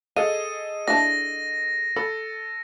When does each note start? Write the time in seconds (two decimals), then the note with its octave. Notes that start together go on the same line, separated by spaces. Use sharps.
0.16 G#4 A4 D#5 F5 D#7
0.88 D4 E4 A5 A#6
1.96 A4 B5